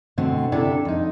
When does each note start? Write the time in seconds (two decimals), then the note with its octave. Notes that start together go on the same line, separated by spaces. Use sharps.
0.18 B2 D3 A3 C4
0.52 C3 D4 E4 A4
0.85 F2 D#4